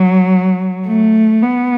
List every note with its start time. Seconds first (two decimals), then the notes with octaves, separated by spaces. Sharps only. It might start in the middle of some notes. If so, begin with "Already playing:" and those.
Already playing: F#3
0.87 A3
1.42 B3